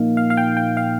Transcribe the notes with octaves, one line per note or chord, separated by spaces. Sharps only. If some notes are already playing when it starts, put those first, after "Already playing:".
Already playing: A#2 F3 A#3 D#4 F5
F5
F5
G5
G5
F5